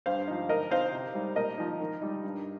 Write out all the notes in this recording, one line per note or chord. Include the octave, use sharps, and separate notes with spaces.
G2 C5 F5
F3 D#4
D#3 A#4 D#5
C4 D#4 C5 F5
C3
G3 D#4
A#2 A#4 D#5
F3 D#4
D#3
G3 D#4
G2